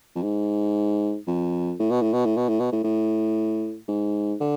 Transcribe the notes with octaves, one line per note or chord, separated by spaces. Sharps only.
F2
G#2
F2
A2
B2
A2
B2
A2
B2
A2
B2
A2
A2
G#2
D3